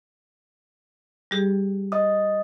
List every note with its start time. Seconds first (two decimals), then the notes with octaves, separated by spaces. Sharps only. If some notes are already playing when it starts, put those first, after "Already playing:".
1.31 G3 G4 G#4
1.92 D#5 D#6